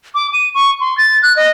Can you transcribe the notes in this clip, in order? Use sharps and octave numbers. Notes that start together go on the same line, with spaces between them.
D6
D#7
C#6
C6
A6
F#6
D#5